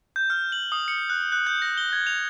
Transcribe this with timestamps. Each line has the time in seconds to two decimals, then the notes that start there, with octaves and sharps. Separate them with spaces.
0.16 G6
0.30 F6
0.52 F#7
0.72 D#6
0.88 C#7
1.10 F#6
1.32 F#6
1.47 G6
1.62 A#6
1.77 G7
1.93 G#6
2.07 F7